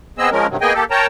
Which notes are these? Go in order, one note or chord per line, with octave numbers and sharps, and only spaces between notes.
B3 C4 G#4 D#5 E6
F3 G#3 C#4 A#4
G2 C3 D#3 F#3
A#3 B3 G#4 D#5 G5 G#5
A#3 G4 A4
A#4 C#5 G5 A5 A#5